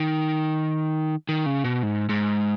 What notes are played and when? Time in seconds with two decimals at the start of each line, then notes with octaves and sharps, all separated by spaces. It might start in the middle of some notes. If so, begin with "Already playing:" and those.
Already playing: D#3
1.29 D#3
1.46 C#3
1.64 B2
1.83 G#2
2.09 G#2